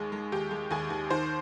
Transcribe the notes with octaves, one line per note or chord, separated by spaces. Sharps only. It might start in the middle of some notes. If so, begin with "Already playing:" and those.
Already playing: D#2 D#3 G#3 G#4
G#3
D#2 G4
G#3
D#2 G#4
D#2
D#3 C5